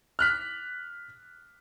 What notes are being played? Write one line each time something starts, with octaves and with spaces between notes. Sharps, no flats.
F6 F#6 B6